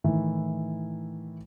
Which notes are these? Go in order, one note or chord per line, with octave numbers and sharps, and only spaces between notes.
A2 D#3 E3 E4